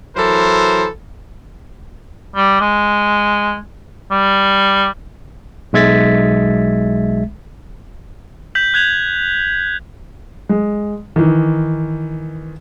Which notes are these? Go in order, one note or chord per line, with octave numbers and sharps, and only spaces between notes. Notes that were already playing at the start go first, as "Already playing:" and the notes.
E3 F#3 E4 A4 A#4 C5
G3
G#3
G3
B1 G#3 E5 G#6 A6 B6
G6 B6 F#7
F#6 G#6 F7 F#7
G#3
D#3 E3